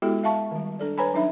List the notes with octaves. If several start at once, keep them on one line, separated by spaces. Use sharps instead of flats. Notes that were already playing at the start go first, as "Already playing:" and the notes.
G#3 B3 E4 F#4 G4 A4
E5 F5 A5 C#6
D#3 G3
D4 A4 D5
B4 C#5 G#5 A#5 B5
F#3 D4 D#4 E5 B5